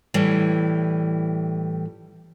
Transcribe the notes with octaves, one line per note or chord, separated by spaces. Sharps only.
A2 E3 G3